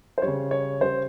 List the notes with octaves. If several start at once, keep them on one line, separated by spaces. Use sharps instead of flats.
C5
C#3 G3 C#5
C#5
C#3 G3 C5